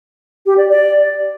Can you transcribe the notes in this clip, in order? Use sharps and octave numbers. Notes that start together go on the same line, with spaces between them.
G4
D5
D5